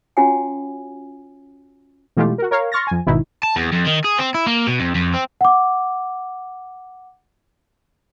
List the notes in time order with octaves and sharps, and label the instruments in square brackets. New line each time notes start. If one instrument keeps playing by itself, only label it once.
[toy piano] C#4 F4 F#4 C#5 F#5 G#5
[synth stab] B2 E3 G#3 A3 F4 G4
F#4 A#4
A#4 C#5 F5
C6 C#6 F6 A6 A#6
F2 G#5
G#1 B2 D#3 E4
[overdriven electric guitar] A5
E2
F2
D#3
G#4
C4
E4
A#3
B2
F2
F2
C4
[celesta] F#5 D6